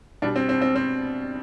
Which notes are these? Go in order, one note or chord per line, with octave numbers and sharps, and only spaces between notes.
B2 G3 D4
C4
C4
C4
C4